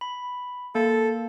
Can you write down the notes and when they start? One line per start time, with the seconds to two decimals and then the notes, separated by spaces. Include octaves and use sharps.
0.01 B5
0.75 A#3 A4